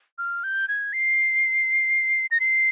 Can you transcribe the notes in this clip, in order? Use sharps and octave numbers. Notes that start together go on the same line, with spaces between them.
F6
G6
G#6
C7
A#6
C7